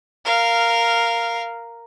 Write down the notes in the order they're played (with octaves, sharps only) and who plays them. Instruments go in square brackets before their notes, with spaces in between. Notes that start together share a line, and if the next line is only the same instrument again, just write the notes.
[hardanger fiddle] A#4 F5